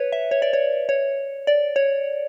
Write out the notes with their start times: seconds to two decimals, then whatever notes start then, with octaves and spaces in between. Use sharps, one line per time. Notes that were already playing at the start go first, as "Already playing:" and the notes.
Already playing: B4 C#5
0.12 E5
0.31 C#5
0.42 D5
0.53 C#5
0.89 C#5
1.47 D5
1.76 C#5